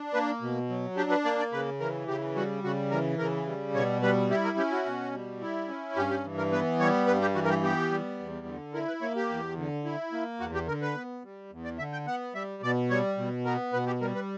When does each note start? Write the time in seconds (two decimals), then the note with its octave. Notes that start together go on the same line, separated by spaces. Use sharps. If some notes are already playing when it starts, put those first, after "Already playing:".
Already playing: D4
0.14 A#3 B4
0.41 B2
0.70 F#3
0.97 D4 G4
1.11 B4
1.25 A#3 D5
1.39 D5
1.52 C#3 B4
1.80 E3 A#4
2.08 C#3 G4
2.36 G3 F#4
2.64 C#3 F#4
2.91 E3 A#4
3.19 C#3 A#4
3.46 G3
3.74 B2 C#5
4.02 G3 B4
4.30 E4 G4
4.44 A#4
4.58 C#4 G4
4.71 F#4
4.86 B2
5.13 G3
5.41 E4
5.69 C#4
5.96 G2 G4
6.10 G4
6.24 E3
6.38 A#4
6.52 B3 B4
6.80 G3 C#5
7.07 G2 B4
7.21 G4
7.35 E3 F#4
7.44 A#4
7.49 G4
7.63 B3 G4
7.91 G3
8.19 E2
8.46 D3
8.74 E4 A#4
8.88 B4
9.01 A#3 C#5
9.16 G4
9.29 E2
9.57 D3
9.85 E4
10.12 A#3
10.40 E2 F#4
10.54 G4
10.68 D3 A#4
10.82 B4
10.96 B3
11.24 G3
11.51 E2
11.65 D5
11.78 D3 E5
11.93 G5
12.07 B3 F#5
12.34 G3 E5
12.62 B2 D5
12.90 G3 C#5
13.18 B2
13.45 B3 A#4
13.73 B2 B4
13.87 G4
14.01 G3 A#4
14.15 B4